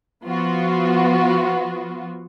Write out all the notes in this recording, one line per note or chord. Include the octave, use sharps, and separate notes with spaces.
F3 B3 F4 F#4